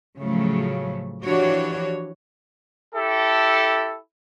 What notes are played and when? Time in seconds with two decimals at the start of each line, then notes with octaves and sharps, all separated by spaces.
0.19 A2 C#3 F3 F#3 A3
1.23 E3 F3 D4 F#4 G4 C#5
2.95 E4 G4 A4